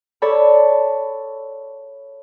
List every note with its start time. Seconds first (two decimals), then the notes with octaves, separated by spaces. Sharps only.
0.22 A4 C#5 D5 A5 B5